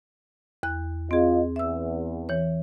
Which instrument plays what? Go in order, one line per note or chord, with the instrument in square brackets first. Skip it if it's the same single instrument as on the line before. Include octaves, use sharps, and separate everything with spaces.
[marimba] E2 F#6
[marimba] C4 G#4 [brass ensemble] F4 D#5
[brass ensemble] E2 [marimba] E5 E6
[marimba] E3 C#5